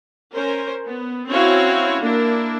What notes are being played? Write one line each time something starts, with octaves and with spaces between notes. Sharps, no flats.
C#4 A#4 C5
B3
C4 C#4 E4 F#4 C#5 F5
A#3 D4 E4 A#4